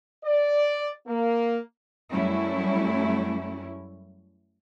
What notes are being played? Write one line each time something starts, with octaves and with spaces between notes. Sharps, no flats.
D5
A#3
F#2 F#3 G3 A3 C#4 E4